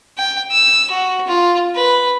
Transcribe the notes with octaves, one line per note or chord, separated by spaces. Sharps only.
G5
E6
F#4
F4
B4